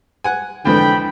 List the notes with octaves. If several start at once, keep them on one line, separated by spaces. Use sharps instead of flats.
F#5 G#5
F2 G#2 D3 E3 G5 B5